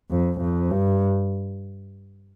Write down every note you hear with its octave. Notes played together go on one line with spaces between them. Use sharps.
F2
F2
G2